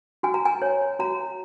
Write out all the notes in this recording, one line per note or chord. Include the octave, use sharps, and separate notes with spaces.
F#4 G#5
A#5
G#5
C#5
F#4 A#5